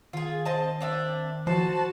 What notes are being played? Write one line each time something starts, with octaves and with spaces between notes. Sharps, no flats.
D#3 F4 G#4
C4 D#5 A5
C4 D4 E5
F3 F#4 C5 A5